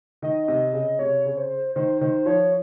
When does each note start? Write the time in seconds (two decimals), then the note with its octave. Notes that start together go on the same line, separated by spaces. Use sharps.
0.22 D#3 D#5
0.48 C3
0.73 C#3
0.99 C3 C#5
1.25 C#3
1.37 C5
1.75 D#3 C5
2.01 D#3 C5
2.26 F3 C#5